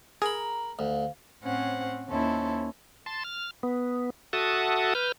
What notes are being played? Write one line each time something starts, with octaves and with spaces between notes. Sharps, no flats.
G#4 A#4 A#5 B5
D2 F5
A2 C4 C#4 C5 F#5
D#2 C#4 E4 A4 C5
A5 C6
F6
B3
F#4 A4 E5 F#5 A5 D#6
B4 F6 G6